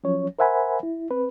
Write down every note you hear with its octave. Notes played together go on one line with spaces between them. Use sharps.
F3 F#3 C#4 C#5
A#4 C5 E5 F#5 G#5 B5
E4
C4 B4